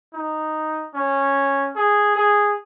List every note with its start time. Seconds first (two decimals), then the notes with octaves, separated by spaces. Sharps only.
0.13 D#4
0.94 C#4
1.76 G#4
2.16 G#4